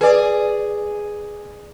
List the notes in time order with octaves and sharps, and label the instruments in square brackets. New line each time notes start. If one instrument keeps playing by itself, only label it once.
[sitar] G#4 D5 [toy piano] B4 G#5